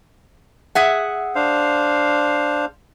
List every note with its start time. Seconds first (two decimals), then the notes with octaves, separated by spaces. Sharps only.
0.75 G#4 E5 F#5
1.35 D4 C5 F5